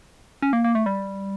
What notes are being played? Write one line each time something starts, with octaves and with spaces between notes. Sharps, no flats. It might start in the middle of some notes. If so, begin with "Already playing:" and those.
C#4
A#3
A#3
A3
G3